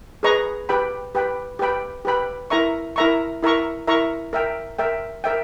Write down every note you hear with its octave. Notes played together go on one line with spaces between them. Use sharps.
G#4 B4 D#5 A#5 C#6
G4 B4 G5 B5
G4 B4 G5 B5
G4 B4 G5 B5
G4 B4 G5 B5
E4 A#4 E5 A#5 C#6
E4 A#4 E5 A#5 C#6
E4 A#4 E5 A#5 C#6
E4 A#4 E5 A#5 C#6
A#4 E5 G5
A#4 E5 G5
A#4 E5 G5